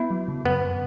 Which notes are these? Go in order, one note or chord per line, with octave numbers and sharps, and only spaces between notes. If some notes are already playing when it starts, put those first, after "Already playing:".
Already playing: B3 E4
F#3
C#3
F#2 B3
C#3